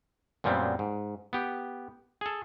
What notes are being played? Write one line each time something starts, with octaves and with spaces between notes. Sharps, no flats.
F#2 A#2 F3 G3 B3 C4
G#2
B3 G4
G#4 A4